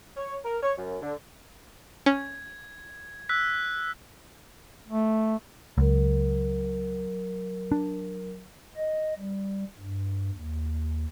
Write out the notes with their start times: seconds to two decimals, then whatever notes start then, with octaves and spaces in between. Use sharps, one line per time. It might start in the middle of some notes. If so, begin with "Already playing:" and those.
0.17 C#5
0.45 A#4
0.63 C#5
0.78 F#2
1.02 D3
2.06 C#4 G#6
3.29 E6 F#6 B6
4.87 A3
5.78 C#2 F#3 A#4
7.72 D4
8.76 D#5
9.18 G3
9.78 G2
10.34 D#2